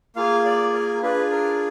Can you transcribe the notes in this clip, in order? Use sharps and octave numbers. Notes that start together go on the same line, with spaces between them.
A#3 F4 G#4 F5
D5
A#4
D4 F4 G#4 B4
A#4